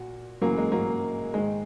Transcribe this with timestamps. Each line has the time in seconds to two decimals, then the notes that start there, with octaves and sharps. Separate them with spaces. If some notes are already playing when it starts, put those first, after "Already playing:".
Already playing: A#2 F#4
0.41 F#2 C#3 E3 F#3 A#3
0.57 G#3
0.72 F#3 A#3
1.34 G#2 D#3 G#3